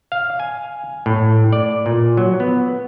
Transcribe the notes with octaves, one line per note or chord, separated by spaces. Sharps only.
F5
G#5
A2
D5
A#2
F#3
B3